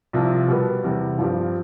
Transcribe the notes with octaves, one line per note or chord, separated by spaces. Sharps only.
C2 C3 F3
B2 G3 B3
E2 C3 G3
G2 F3 C4 G4